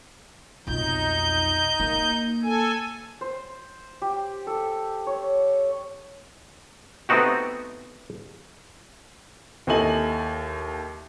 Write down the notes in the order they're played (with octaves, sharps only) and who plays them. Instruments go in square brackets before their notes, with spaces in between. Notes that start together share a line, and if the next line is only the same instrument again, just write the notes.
[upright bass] B1 F2 [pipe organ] D#4 G6
[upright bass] A#3
[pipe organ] A4 G#5
[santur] C5
G4
A4
C#5
[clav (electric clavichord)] A3 B3 C4 D#4 F#4 G4
[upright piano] D#2 E4 A4 D#5 G#5 F#7